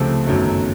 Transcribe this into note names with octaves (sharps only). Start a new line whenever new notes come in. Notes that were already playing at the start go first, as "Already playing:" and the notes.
Already playing: C#2 C3 F3 A3 C4
G1 F#2 D#3 F#3 A3